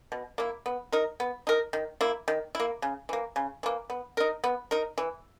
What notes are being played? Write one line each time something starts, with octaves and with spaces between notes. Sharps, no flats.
B2
A#3 E4
B3
D#4 A#4
B3
D#4 A#4
D#3
A#3 E4
D#3
A#3 E4
C#3
E3 A#3
C#3
E3 A#3
B3
D#4 A#4
B3
D#4 A#4
E3